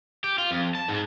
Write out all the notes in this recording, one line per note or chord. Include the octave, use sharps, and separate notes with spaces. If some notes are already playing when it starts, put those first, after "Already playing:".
G4
F4
F2
A5
G#2